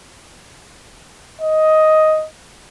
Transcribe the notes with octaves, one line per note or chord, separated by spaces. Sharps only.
D#5